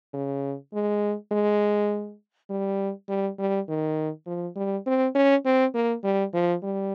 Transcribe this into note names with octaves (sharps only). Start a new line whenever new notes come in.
C#3
G#3
G#3
G3
G3
G3
D#3
F3
G3
C4
C#4
C4
A#3
G3
F3
G3